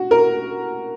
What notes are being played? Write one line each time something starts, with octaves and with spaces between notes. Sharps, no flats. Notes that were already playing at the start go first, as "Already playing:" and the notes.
Already playing: F#4
A#4